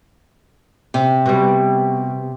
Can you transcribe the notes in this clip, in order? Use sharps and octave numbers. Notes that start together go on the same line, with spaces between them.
C3
B2 G3